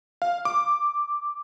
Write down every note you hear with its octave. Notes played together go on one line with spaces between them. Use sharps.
F5
D6